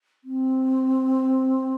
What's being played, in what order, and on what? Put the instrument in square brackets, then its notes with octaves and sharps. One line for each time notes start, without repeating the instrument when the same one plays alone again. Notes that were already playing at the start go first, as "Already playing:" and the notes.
[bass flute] C4